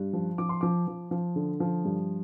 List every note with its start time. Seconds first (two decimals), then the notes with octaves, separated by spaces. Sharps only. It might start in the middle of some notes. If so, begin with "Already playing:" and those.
Already playing: G2
0.13 F3
0.38 F3 D6
0.49 C6
0.61 F3 D6
0.87 F3
1.11 F3
1.36 D3
1.60 F3
1.85 G2